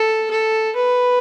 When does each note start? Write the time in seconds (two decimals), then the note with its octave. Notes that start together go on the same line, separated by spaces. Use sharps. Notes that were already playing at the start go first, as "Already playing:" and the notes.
Already playing: A4
0.30 A4
0.76 B4